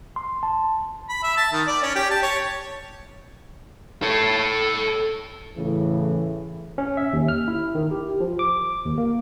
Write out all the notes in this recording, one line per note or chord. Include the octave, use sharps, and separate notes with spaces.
C6
A5
B5
E5
A5
D#3
D5
C#4
G4
A5
C#5
A4 C#5
A2 C#3 E3
C#4
E5
D#2
F6
E4
D#3
G4
F3
D6
D#2
A#3